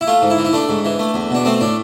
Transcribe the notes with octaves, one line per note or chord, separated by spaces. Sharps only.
E4
A3 F4
G#2
E4
E3
E4
A3 D4
G#2
E3
A3
E2
B2 D4
A3 C4
A2 D4